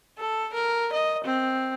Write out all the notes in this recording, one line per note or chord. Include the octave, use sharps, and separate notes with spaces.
A4
A#4
D#5
C4